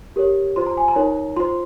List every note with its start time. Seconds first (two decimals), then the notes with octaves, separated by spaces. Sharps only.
0.16 G4 A#4 C#5
0.56 F4 C5 C6
0.66 A#5
0.77 G#5
0.88 A#5
0.96 D#4 A#4 C#5
1.36 F4 C5 C6